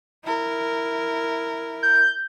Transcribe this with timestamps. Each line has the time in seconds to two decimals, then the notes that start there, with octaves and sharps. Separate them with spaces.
0.25 E4 A#4
1.83 G6